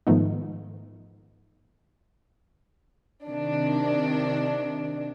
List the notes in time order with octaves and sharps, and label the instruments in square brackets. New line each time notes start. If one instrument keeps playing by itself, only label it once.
[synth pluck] G#2 D#3 F3 A3 B3 D#4
[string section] C3 D#3 D4